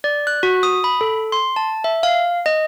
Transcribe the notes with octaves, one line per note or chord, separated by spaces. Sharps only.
D5
F#6
F#4
D#6
B5
A4
C6
A5
E5
F5
D#5